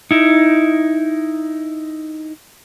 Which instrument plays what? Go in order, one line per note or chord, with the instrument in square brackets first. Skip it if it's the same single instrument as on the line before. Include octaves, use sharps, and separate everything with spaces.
[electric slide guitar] D#4 E4